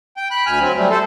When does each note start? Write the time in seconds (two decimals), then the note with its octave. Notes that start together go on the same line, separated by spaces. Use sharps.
0.17 G5
0.31 B5 F#6
0.46 D2 G#5 B5 F6
0.60 F#3 C4
0.77 G3 A3
0.90 A4 C5